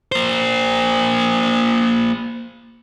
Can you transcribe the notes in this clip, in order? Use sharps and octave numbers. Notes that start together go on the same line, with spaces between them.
A#3 C5